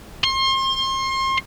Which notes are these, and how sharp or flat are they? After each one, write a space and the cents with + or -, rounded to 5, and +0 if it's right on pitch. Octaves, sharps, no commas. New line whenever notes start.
C6 +35